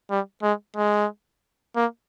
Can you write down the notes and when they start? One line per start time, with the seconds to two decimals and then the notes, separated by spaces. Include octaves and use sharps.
0.10 G3
0.43 G#3
0.76 G#3
1.76 A#3